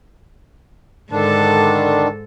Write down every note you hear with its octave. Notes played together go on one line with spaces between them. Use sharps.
G#2 D3 D#3 D4 A4